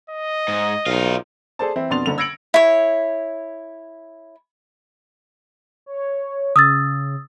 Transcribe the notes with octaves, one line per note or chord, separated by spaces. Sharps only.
D#5
G#2
B1 D#4 F4
G#4 A4 C5 D5 A5
E3 C4 E4
F2 B2 D4 C6 A6 F7
F#1 D3 F7
E6 G#6 A#6 C#7 D7 F#7
E4 C#5
C#5
C#3 D#6 E6 A6